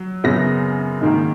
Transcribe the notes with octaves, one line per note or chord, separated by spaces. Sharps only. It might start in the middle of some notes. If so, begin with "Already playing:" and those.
Already playing: F#3
F#2 C#3 F#3 B3 A#6
G#2 D#3 A#3